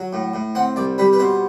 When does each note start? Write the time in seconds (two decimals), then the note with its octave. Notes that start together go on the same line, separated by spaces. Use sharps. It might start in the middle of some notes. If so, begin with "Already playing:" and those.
Already playing: F#3
0.13 A2
0.34 A2
0.55 C4 F#5
0.76 C2 D5
0.98 G3 B4
1.13 B4
1.19 B2 C5